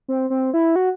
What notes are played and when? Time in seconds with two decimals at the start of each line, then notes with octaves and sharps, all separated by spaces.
0.08 C4
0.30 C4
0.54 E4
0.76 F#4